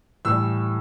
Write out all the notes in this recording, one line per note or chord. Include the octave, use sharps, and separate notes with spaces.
A2 E3 G3 E6